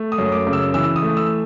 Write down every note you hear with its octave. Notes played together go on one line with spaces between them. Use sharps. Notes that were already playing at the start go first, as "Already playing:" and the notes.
Already playing: A3
D#6
F#2
D6
C#3
E6
E3 E6
D#6
A3
E6